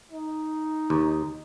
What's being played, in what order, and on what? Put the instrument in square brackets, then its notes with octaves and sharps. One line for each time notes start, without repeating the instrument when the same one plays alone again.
[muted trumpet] D#4
[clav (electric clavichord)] D#2